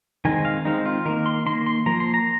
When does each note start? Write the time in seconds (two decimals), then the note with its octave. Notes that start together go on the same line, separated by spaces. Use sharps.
0.25 D#3 G#3 C4 G#5
0.45 F5
0.65 D#3 G#3 C4 D#4
0.86 F4
1.05 D#3 A#3 A#4
1.26 C6
1.46 D#3 A#3 C6
1.66 C6
1.86 F3 A#3 A#5
2.00 C6
2.14 A#5